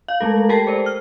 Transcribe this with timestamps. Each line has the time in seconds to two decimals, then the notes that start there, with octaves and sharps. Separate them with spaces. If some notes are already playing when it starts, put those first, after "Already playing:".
0.08 F5
0.20 G#3 A3 A4
0.49 G4 A4 A#4 G5 A5 C7
0.67 C5 D5
0.86 F6